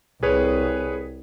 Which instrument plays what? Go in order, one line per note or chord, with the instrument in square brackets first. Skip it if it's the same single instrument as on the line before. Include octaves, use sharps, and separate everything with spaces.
[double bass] C2 [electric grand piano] G#4 B4 C#5